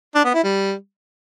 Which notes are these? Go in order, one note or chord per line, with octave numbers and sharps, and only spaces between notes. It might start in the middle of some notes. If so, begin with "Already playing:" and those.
D4
B3
E4
G3